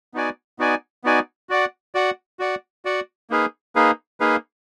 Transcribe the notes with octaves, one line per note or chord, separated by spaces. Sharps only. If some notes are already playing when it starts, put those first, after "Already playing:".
B3 D#4 F#4 D5 G#5
B3 D#4 F#4 D5 G#5
B3 D#4 F#4 D5 G#5
F#4 D5 F#5
F#4 D5 F#5
F#4 D5 F#5
F#4 D5 F#5
A#3 D#4 G#4 B4 F5
A#3 D#4 G#4 B4 F5
A#3 D#4 G#4 B4 F5